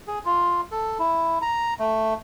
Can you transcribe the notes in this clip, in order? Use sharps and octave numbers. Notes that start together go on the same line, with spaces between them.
G#4
F4
A4
E4
A#5
A3